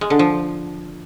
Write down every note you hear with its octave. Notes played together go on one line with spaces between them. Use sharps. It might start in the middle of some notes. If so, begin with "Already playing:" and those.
G#3
D3
F3